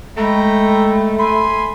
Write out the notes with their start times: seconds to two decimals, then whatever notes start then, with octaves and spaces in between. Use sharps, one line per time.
0.17 G#3 A3 G5 A#5 B5
1.19 G#5 B5 C6